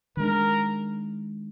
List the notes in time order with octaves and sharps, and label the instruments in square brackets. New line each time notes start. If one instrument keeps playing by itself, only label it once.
[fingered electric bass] D#3 G#3 D4 [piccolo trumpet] A#4